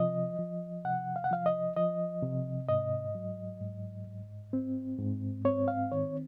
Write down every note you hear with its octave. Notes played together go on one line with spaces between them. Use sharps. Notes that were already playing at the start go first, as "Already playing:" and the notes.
Already playing: C3 F3 D#5
F3
C3 F#5
F5
F#5
F3 F5
D#5
F3 D#5
C3
G#2 D#5
F#3
G#2
G#2
C4
G#2
C4 C#5
F5
D#3 C#5